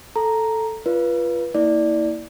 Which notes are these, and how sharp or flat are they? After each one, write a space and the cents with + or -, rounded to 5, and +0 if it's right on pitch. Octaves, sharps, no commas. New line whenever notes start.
A4 +0 A#5 +0
F4 -20 B4 -20 D5 -30
A#3 +0 E4 -30 D5 +0